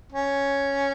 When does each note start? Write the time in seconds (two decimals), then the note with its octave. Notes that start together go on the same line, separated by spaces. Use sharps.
0.12 C#4